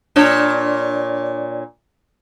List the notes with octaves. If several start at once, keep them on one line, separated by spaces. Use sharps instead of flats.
A#2 D4 C#5